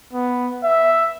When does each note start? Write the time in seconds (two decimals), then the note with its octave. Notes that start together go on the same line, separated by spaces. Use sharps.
0.13 B3
0.64 E5